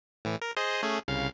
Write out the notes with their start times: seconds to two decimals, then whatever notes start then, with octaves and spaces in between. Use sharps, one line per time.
0.25 A2 E3
0.41 A#4
0.57 G#4 C5 D#5
0.83 A3 C#4 G#4
1.08 C2 C#3 F5